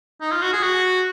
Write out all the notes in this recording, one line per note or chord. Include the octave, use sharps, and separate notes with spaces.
D#4
F4
F#4
G#4
F#4